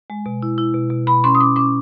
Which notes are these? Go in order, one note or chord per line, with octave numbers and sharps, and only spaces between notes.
G#3
B2
E4
E4
B2
B2
B2 B5
C#4 C6
D#6
C#4 D6
C#4 D6